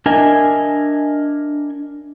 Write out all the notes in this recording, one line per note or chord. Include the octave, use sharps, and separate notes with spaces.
D4 A#4 D#5 E5 G#5